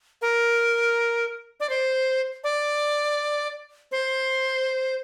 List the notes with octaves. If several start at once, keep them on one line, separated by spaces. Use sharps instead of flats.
A#4
D5
C5
D5
C5